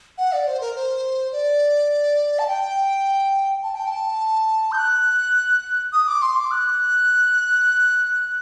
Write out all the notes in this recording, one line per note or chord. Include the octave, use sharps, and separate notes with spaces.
F#5
D5
C5
A#4
C5
D5
A5
G5
A5
G5
A5
G6
F#6
D#6
D6
C6
D6
F#6